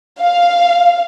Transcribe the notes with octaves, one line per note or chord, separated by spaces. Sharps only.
F5